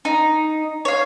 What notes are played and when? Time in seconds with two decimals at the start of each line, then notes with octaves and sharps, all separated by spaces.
0.05 D#4
0.85 C#5 F5